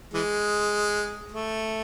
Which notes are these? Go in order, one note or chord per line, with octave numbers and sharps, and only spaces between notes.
E3 G#3
A3